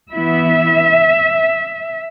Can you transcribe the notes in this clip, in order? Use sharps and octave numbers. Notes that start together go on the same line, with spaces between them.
E3 B3 E4 E5